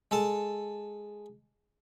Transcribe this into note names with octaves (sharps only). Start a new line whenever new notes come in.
G#3 A4 A5